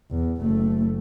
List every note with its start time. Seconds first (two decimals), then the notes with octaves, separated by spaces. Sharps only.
0.11 E2
0.41 F#1 A3